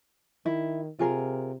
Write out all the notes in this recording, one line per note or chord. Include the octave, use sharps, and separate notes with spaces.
D#3 E4
C3 F4 G#4 A#4